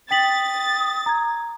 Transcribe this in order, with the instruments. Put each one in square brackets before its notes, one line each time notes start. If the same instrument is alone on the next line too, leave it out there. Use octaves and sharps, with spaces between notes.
[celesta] G5 B6 F#7 [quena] D#6 [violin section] A6
[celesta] A#5 G#6